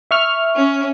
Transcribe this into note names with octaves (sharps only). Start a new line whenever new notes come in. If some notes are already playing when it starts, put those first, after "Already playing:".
E5 C#6 F6
C#4